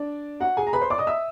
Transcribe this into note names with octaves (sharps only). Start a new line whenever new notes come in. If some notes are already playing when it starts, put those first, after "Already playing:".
Already playing: D4 D5
F#4 F#5
G#4 G#5
A#5
B4 B5
C5 C6
D5 D6
D#5 D#6
E5 E6